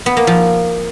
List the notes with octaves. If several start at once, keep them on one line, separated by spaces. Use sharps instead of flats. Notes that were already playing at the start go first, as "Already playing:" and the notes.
B3
A#3
F3